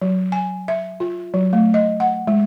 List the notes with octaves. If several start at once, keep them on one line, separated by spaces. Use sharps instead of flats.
F#3
G#5
E5
F4
F#3
A3
D#5
F#5
G#3